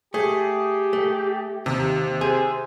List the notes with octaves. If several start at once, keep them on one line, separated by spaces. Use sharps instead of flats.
A3 G4 G#4
A3
D#2 C3
G#4 C5